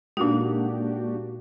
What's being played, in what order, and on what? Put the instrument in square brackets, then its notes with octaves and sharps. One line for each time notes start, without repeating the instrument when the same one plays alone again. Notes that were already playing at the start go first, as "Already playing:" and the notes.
[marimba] A#2 D#4 [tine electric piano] G#3 A#3 [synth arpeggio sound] D4 F#4 G4